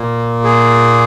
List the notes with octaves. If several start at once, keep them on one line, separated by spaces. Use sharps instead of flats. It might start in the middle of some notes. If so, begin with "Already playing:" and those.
Already playing: A#2 A#3
G#4